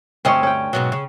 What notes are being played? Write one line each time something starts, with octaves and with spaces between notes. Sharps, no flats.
D2 G2 C4 C#4 C#5 D#5
C#4 G5
G#2 B2 F#3
C#3